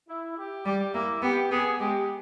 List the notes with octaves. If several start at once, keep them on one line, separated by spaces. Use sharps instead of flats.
E4
G4
G3 G4
A#3 E4
B3 G4
B3 G#4
G#3 G4